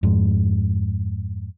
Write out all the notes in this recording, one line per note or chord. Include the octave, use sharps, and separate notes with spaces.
F2 G#2